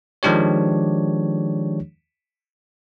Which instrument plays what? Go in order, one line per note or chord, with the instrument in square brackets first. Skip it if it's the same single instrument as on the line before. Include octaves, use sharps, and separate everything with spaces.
[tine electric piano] D#3 F3 G#3 D4 G4 C#5